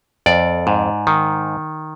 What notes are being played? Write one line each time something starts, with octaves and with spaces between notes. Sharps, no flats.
F2 D5
G#2
D#3